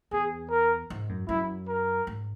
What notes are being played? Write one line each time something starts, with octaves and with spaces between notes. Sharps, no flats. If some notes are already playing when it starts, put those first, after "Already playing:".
E2 G#4
A#4
G#2
F#2
F#2 E4
A#4
G#2